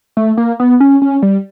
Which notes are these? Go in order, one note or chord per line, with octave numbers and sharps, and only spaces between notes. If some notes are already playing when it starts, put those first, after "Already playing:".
A3
A#3
B3
C#4
C#4
G3